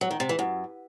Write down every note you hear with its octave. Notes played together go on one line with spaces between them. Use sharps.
F#3
D#3
C3
E3
F#2